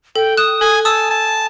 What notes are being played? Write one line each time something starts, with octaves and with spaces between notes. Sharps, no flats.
A4 G5
D#6 F#6 E7
A4 G#5
G#5 A5 D#6 E6
A5